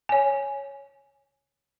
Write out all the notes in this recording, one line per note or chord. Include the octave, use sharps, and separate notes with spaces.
C#5 G#5